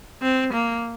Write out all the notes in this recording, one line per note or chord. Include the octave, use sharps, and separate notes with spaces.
C4
A#3